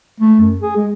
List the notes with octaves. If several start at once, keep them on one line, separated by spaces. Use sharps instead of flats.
A3
F#2
G#4
G#3